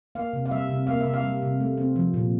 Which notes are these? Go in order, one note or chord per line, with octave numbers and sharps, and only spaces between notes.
A#3 F5
C3
F5
G3 E5
C3
A#3 F5
C3 E5
F5
G3
C3
A3
C4
F3
A#2